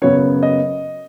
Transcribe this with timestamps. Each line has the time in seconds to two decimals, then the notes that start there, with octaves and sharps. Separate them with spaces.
0.02 F#2 C#3 F#3 B3 C#5
0.43 D#5